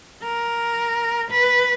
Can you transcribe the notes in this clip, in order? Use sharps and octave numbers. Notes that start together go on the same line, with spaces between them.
A#4
B4